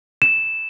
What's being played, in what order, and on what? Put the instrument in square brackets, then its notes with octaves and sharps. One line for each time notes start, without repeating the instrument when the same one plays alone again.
[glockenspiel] E7